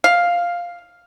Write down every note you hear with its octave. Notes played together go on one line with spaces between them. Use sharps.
F5